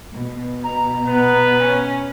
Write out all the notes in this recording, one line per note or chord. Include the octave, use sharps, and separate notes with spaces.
B2
A#5
B3 B4
C#4